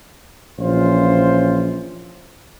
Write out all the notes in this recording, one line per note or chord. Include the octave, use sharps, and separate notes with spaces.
A#1 E3 C#4 F4 C5